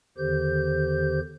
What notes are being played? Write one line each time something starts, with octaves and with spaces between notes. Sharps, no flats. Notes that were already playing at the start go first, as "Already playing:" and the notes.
E2 D3 D#3 G4 C5 G6